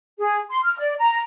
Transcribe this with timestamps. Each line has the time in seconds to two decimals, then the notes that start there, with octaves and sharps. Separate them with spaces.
0.19 G#4
0.49 C6
0.63 F6
0.79 D5
0.98 A#5